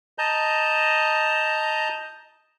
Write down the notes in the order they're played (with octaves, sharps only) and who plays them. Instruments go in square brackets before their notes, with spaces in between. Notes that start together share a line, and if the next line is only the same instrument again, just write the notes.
[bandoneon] D#5 A5 A#5 G6